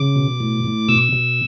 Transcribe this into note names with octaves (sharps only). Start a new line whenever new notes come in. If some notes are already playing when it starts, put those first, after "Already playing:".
Already playing: C#3 D6
B2
A2
A2
B2 E6
B2